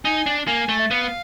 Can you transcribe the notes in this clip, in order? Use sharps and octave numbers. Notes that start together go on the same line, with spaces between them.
D#4 G#5
D4
A#3 G#5
A3
E5
B3 F5